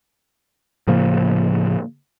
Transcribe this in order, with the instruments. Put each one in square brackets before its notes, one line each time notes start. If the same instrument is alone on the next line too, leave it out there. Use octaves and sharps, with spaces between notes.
[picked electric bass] A2 C#3 F3 A#3